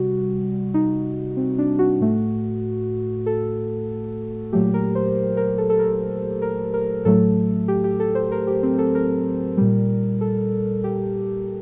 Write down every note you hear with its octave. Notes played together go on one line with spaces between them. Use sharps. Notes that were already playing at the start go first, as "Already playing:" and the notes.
Already playing: C3 G3 F#4
D#4
C4
D4
F#4
A2 A3
A4
A#2 F#3 A3 G4
A#4
C5
A#4
A4
A4
A#4
A#4
A#4
A2 F#3 A3 A4
G4
G4
A4
C5
A#4
G4
C4
A4
A#4
A#2 G3
A4
G4